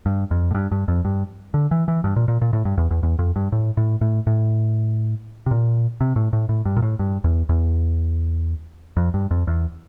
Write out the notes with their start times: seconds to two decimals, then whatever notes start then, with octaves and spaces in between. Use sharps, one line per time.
0.06 G2
0.31 F2
0.51 A2
0.55 G2
0.72 G2
0.88 F2
1.05 G2
1.54 D3
1.71 E3
1.88 E3
2.04 G2
2.16 A#2
2.28 A#2
2.41 A#2
2.53 A2
2.65 G2
2.78 E2
2.91 E2
3.03 E2
3.19 F2
3.36 G2
3.52 A2
3.77 A2
4.01 A2
4.27 A2
5.46 C3
5.51 A#2
6.01 C3
6.16 A2
6.33 A2
6.49 A2
6.65 G2
6.77 A#2
6.82 A2
6.99 G2
7.24 E2
7.49 E2
8.97 F2
9.14 G2
9.31 F2
9.47 E2